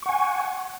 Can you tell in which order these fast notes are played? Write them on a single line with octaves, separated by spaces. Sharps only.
C#6 F#5 G#5